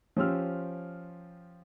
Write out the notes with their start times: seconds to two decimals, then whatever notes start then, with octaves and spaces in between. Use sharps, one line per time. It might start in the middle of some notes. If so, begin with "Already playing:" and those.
0.17 F3 C#4 G4 C5 E6 F6